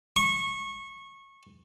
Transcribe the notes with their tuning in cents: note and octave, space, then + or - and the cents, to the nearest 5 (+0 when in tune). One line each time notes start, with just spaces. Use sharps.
C#6 -20